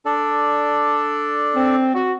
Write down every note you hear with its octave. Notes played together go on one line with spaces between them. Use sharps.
D4 A4 D5
C4
F#4